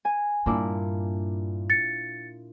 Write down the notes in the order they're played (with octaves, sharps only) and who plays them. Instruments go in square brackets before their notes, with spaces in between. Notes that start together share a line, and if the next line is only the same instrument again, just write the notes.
[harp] G#5
[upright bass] G2 [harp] A#2 D4 E4
[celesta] A6 C#7